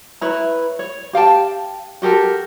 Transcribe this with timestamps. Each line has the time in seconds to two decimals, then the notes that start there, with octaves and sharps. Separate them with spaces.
0.21 E4 B4 C#5 A#5
0.79 C#5
1.13 G4 F5 G5 A5
2.02 F#4 G4 A4 A#4